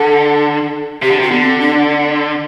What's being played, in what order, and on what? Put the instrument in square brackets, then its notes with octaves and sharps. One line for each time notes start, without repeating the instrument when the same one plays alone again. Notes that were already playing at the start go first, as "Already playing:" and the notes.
Already playing: [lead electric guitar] D3 [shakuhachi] A4
[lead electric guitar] C3 [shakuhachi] G4
[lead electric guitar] D3
[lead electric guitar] C3 [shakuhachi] F#4
[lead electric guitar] D3 [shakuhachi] B3
[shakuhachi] C4
D4